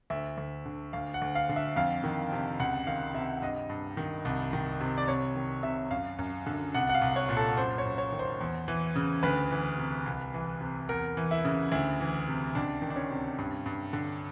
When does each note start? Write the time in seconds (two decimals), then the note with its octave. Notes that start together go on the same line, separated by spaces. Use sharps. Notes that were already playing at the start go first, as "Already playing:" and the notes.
0.10 D2 E5
0.38 D2
0.66 D3
0.93 D2 F5
1.14 F#5
1.22 D2
1.35 F5
1.49 D3
1.56 E5
1.76 F2 F5
2.04 D#3
2.32 C3
2.60 C#2 F#5
2.87 D#3 F5
3.14 C3 E5
3.42 G2 D#5
3.69 G2
3.97 D#3
4.25 C2
4.53 D#3
4.80 C3
4.98 D5
5.08 C2 C#5
5.35 D#3
5.63 C3 E5
5.91 F#2 F5
6.19 F#2
6.47 D3
6.74 C2 F#5
6.89 F#5
6.94 F5
7.01 C2
7.16 C#5
7.29 A#2
7.37 A4
7.58 F#2 C5
7.78 C#5
7.85 F#2
7.98 C#5
8.12 D#3
8.19 C5
8.41 E2
8.68 E3
8.96 C#3
9.23 D2 B4
9.51 E3
9.78 C3
10.06 C2
10.34 E3
10.61 C3
10.89 E2 A#4
11.17 E3
11.31 E4
11.45 C#3
11.71 D2 E4
12.00 E3
12.28 C3
12.55 C#2 D4
12.82 D#3
12.90 D4
12.96 C#4
13.11 C3
13.38 G2
13.66 G2
13.93 D3